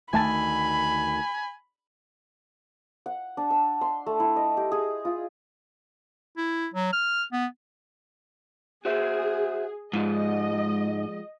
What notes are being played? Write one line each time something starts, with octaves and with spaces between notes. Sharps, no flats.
D2 D#3 A3 G#5 A5 B5 A6
F#5
D4
E6
C6
A3
E4
D#5
G4
G#4
F4
E4
F#3
F6
B3
F#4 G#4 C5 E5
G#2 F3 G#3 F4 D#5